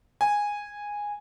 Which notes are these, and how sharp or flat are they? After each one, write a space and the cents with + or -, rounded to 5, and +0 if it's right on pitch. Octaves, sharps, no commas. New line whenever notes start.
G#5 -10